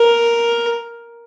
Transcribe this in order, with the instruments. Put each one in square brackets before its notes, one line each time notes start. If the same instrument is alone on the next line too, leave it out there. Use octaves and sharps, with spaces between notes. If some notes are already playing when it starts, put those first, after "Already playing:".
Already playing: [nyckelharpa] A#4